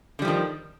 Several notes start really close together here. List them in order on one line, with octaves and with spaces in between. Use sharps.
D3 G3 F3 D#3